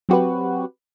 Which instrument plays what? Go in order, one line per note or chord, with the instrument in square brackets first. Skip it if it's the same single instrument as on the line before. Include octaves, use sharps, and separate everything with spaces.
[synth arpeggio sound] F#3 C4 F#4 G4 B4